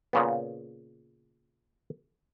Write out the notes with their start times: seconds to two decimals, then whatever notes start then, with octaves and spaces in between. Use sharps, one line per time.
0.13 A#2 C#3 B3